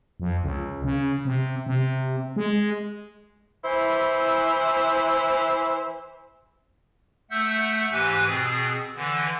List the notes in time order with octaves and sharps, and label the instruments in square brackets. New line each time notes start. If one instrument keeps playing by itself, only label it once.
[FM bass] F2
C#2
C#3
C3
C3
G#3
[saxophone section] E3 E4 C5
[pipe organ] A3 E5 F#5 E6 G6
G#2 E3 G4 B4 G#5 F#6
B2 C4 G#4
D3 E3